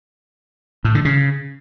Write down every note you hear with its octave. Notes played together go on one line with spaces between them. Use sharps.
A2
D3
C#3